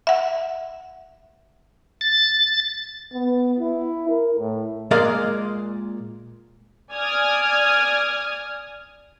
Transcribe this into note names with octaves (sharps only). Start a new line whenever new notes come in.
E5 F#5
A6
B3
E4
A#4
A2
A#2 G#3 G#4 A#4 D5 F5
D5 G#5 D#6 F6 G#6